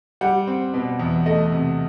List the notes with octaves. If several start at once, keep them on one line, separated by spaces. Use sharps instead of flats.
G3 F#5
C4
B2
E2
A3 D#5
C3